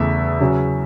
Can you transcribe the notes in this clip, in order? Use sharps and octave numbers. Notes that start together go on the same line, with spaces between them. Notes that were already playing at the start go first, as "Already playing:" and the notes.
Already playing: E2 C#3 E3 A3 E5
C#3 F#3 C#4